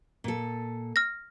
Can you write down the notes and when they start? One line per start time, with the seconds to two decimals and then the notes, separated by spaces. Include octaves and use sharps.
0.24 A#2 A4
0.96 F6 A#6